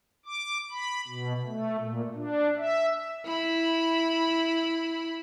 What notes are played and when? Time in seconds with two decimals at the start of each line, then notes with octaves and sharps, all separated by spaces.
0.26 D6
0.71 B5
1.08 B2
1.45 A3
1.77 A#2
2.15 D4
2.58 E5
3.25 E4 B5